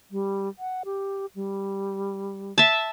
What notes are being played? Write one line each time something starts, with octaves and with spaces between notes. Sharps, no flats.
G3
F#5
G4
G3
E5 A5